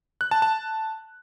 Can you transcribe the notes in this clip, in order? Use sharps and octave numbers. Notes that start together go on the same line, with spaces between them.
F#6
A5
A5